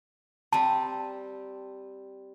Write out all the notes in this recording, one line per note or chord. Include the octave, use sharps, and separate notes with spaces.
G3 C4 A5